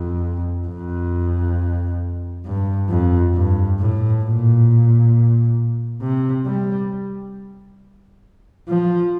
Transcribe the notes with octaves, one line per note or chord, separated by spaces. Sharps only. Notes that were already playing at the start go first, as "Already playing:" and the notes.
Already playing: F2
F2
G2
F2
G2
A2
A#2
C3
G3
F3